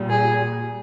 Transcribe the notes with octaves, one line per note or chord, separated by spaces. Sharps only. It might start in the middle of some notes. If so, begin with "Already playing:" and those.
Already playing: A#2 G3
G#4